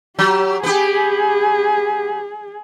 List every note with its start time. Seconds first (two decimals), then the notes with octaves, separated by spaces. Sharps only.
0.19 F#3 G4
0.63 B3 G4 G#4